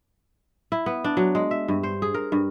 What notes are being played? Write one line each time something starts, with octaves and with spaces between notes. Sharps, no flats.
E4
B3
D4
F#3
G#3
E5
G2
C5
G#4
A#4
G2